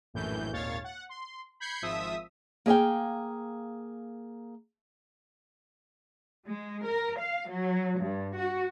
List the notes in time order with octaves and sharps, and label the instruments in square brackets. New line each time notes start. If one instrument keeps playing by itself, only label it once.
[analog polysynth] A#1 F#2 A2 E3 G6
G#1 D#2 A#2 C#5 F5 A6
F#5
C6
B5 G6 G#6 C7 C#7
G#1 F3 E5 D#6 E6 B6
[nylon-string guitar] A#3 G#4 E5 F5 G5
[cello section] G#3
A#4
F5
F#3
G2
F#4